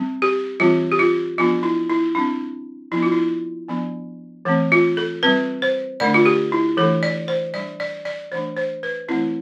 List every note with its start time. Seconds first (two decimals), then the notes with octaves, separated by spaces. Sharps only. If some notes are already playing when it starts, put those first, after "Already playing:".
Already playing: G3 C4
0.22 G4
0.60 E3 G3 C4 F4
0.92 G4
0.99 F4
1.38 F3 B3 D4 F4
1.63 E4
1.90 E4
2.15 G3 C4 D4
2.92 F3 B3 D4 E4
3.03 F4
3.12 E4
3.68 F3 B3 D4
4.45 E3 A3 C4
4.72 F4
4.97 A4
5.23 G3 C4 B4
5.62 C5
6.00 D3 A3 D4 D5
6.14 F4
6.26 G4
6.52 E4
6.77 E3 A3 D4 A4
7.03 D5
7.28 C5
7.54 G3 D4 D5
7.80 D5
8.05 D5
8.32 E3 A3 D4 C5
8.57 C5
8.83 B4
9.08 E3 A3 C4 E4